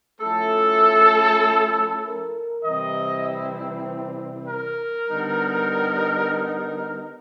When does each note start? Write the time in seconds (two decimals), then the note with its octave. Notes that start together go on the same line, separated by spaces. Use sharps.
0.20 F3 A3 C#4 E4 A4
2.03 A#4
2.64 C3 E3 G3 C4 E4 D#5
4.47 A#4
5.08 D3 G3 B3 D#4
6.30 A#4